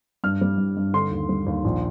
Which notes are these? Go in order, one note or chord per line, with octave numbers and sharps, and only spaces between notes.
G2 F6
G3
G2
G2
D3 C6
D#2
G3
D#2
A#1